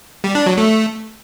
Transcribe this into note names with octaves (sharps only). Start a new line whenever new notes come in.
G3
D4
F#3
A3